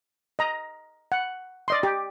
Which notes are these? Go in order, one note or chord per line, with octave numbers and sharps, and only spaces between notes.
D#5 A#5
F#5
D5 D#5 C6
G4